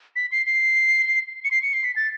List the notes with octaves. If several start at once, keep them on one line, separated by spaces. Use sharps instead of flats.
B6
C7
C7
C#7
C7
C#7
C7
B6
A6